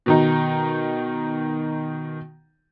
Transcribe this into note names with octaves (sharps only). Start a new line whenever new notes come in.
B2 D#3 D#4